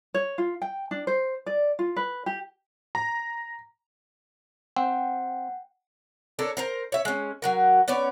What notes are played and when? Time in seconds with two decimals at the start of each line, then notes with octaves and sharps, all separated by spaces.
0.14 C#5
0.38 F4
0.62 G5
0.91 D4
1.07 C5
1.46 D5
1.79 F4
1.96 B4
2.26 G4
2.95 A#5
4.76 C4 F#5 G5
6.39 D4 A4 A#4 C#5
6.57 A#4 C5 A#5
6.92 C#5 E5
7.05 G#3 C#4
7.42 F#3 F#4 A#4
7.88 B3 C#4 C#5 D5